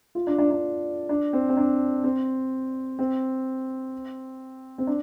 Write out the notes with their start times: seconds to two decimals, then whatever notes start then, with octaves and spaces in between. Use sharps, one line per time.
0.15 F4
0.27 D4
0.38 D4
0.51 D4
1.09 D4
1.33 C4
1.49 C4
1.57 D4
2.04 C4
2.99 C4
4.78 C4
4.87 D4